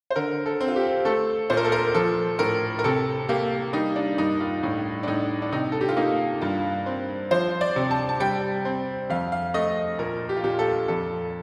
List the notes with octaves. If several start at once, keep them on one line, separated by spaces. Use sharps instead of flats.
C5
D3 A#4
A4
C4
F4
G4
A3 A4
A#2 C5
A#4
A4
A#4
F3 A4
A2 A#4
A#4
C3 A4
A#3 G4
G3 D#4
D4
G2 D#4
F4
A2 D#4
D4
A2 D#4
D4
C3 D#4
A4
G4
F4
A#3 D#4
G2 F4
C4
F3 C5
D5
C3
A5
A5
G3 G5
C4
F2 F5
F5
A3 D#5
A#2 A#4
G4
F4
A#2 G4
A4
F2 A4